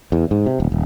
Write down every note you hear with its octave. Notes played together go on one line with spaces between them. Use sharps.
E2
G#2
C3
D#1
D#1